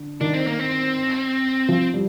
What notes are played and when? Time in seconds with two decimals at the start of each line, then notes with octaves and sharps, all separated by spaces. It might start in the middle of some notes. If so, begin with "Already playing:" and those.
Already playing: D3
0.21 D#3 D4
0.34 C4
0.47 A#3
0.59 C4
1.69 F3
1.94 G3